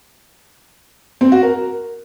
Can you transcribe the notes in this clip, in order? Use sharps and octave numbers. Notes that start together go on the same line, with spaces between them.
C4
F#4
A#4